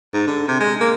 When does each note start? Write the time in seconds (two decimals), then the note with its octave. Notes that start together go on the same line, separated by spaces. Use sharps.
0.14 G#2
0.27 D3
0.48 C3
0.60 G#3
0.80 A#3